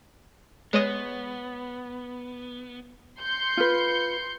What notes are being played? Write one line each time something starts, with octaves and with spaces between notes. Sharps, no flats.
G#3 B3 B4 C#5 D#5
C6 G6 C#7
F4 B4